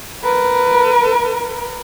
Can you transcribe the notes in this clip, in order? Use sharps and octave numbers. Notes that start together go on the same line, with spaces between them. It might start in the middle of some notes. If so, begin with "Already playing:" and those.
A#4 B4